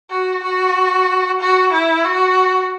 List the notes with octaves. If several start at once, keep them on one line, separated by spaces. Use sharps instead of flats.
F#4
F#4
F#4
E4
F#4